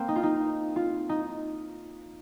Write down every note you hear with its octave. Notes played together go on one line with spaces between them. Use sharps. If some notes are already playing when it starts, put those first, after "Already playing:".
Already playing: A#3 C4
D#4
F4
D#4
F4
D#4